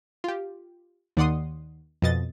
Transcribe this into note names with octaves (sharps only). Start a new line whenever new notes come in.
F4 G4
D#2 D#3 D5 F#5 C6 D#6
F2 B2 D#5 A6